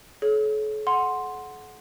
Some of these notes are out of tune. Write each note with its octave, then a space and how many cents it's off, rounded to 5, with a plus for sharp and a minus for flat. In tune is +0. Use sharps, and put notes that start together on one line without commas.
A4 -45 C#5 +5
F#5 -5 C6 +0